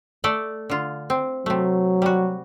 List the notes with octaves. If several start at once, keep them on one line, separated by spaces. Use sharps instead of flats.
A3 A4 D5
D3 F4
C4
C3 F#3 A3
G3 F#4